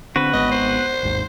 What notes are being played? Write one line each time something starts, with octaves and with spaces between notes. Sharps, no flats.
D3 C4 F#4 B4
G#1 G#2 B3 D#5
C5
G#1 D#2 G#2